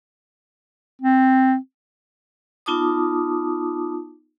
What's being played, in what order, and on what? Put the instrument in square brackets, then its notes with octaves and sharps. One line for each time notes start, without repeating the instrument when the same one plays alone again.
[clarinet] C4
[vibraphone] B3 D#4 F4 A5 D6 D#6